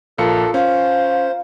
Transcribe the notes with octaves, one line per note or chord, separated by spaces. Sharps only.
A#1 F4 A4 A#4 C#7
C#4 C5 F5